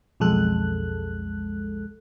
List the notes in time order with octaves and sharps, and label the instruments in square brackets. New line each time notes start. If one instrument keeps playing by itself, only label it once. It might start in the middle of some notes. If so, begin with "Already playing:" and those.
[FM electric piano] B1 F2 G#3 A4 F#6